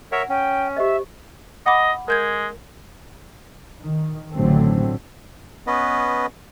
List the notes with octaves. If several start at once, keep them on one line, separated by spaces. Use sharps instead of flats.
A#4 C#5 E5 F#5
C#4 G5
G4 C5 D#5 E5
D#5 F#5 B5 D6
G#3 A#4 G6 G#6
D#3
A1 D3 F#3 A3 C4
B3 C#4 B4 D#5